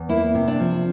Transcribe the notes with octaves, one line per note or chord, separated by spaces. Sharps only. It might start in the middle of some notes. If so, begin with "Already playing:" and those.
Already playing: E2
A#3 E4
C3
D4
F3